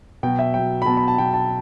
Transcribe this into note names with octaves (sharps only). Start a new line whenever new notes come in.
B2 F#3 G5
E5
B2 F#3 G5
B5
B2 F#3 A5
B5
A5
B2 F#3 G5
A5